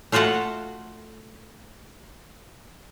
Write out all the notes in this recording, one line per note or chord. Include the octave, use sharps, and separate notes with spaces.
A3 F4 F#4 A4 F#5